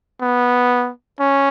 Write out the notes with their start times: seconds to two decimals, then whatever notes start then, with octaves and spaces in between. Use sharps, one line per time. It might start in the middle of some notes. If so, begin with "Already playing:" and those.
0.21 B3
1.20 C#4